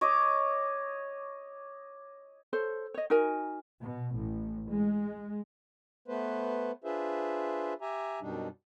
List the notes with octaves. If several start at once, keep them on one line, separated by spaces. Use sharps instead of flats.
C#5 D#5 D6
A4 C5 C#5
C#5 D#5
D#4 F#4 A#4 G#5
B2
A1
G#3
A3 B3 B4 C5
D4 F4 G#4 B4 C5 E5
G4 E5 G#5 A#5
F#2 B2 G3 D4 D#4